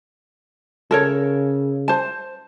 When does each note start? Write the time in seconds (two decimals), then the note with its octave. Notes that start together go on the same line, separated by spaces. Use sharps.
0.91 C#3 A4 A#4 C#5
1.88 C5 A5